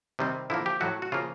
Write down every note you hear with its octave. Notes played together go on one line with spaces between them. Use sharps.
C3 D#3 G3 C4
D3 F3 A#3 E4
G4
A2 F#3 A3 F#4
F#4
C#3 F3 A#3 F4